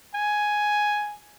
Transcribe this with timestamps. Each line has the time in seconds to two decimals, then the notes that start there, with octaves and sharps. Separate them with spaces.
0.15 G#5